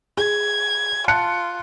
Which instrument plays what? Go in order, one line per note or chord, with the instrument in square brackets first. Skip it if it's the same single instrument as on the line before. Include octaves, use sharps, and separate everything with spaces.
[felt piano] G#4 [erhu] G#6
[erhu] F4 [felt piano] A5 F#6 C#7